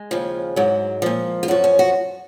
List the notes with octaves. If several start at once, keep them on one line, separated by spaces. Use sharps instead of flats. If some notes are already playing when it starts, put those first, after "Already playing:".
Already playing: G#3
D#2 C#3 F3
G#2 F#3
A#2 F3
F4
F#2 F3 F#4
C#4
F#4